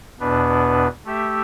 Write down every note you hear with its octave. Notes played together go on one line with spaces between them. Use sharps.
E2 B2 B3 D4 B4
A3 G4 E5